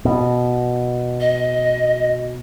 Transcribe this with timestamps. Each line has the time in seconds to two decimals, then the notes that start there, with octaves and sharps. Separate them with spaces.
0.05 B2
1.20 D#5